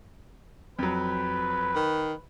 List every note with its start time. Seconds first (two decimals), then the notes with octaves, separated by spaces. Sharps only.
0.79 F2 F#3 B4
1.75 D#3